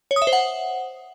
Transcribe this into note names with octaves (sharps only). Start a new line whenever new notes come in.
C#5
D#6
E5
C5
F#5